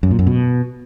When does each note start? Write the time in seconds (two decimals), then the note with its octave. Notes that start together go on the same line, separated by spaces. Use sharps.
0.03 F#2
0.11 A#2
0.19 F#2
0.27 B2